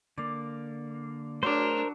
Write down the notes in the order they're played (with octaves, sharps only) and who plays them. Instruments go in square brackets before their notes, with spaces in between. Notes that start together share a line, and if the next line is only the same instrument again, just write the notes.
[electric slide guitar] D3 A#3 [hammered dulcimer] D5
[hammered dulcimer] F#3 D6 [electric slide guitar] A3 F#4 G#4 [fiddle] D4 [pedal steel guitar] A#4 C5